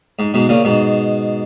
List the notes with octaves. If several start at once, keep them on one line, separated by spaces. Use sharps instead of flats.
G#2
G#2 B2
A#2 C#3
G#2 B2